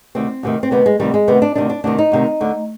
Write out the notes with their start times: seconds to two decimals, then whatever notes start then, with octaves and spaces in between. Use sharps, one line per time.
0.15 D2 C3 D#3 C4
0.43 D2 C3 D#3
0.63 C4
0.71 D2 C3 D#3 B3
0.86 G#3
0.99 D2 C3 D#3 G3
1.14 G#3
1.28 D2 C3 D#3 B3
1.42 D4
1.55 D2 C3 D#3 D4
1.70 D4
1.84 D2 C3 D#3 D4
1.98 D#4
2.12 D2 C3 D#3
2.40 D2 D3